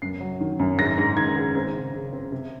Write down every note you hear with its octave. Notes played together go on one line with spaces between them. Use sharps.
F#2 C7
F#3
D#3
F#2
G#2 A#6
G#2
D#3 G#6
G#2
C4 G#6
C#3
C#3
C4
C3